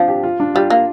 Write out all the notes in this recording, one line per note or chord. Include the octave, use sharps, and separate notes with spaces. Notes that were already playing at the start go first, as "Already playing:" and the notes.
Already playing: F3 C4 D4
G4
F4
D4
G3 F4
A#3